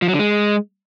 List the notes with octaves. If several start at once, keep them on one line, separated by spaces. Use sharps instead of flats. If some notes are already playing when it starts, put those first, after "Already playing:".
F3
F#3
D3
G#3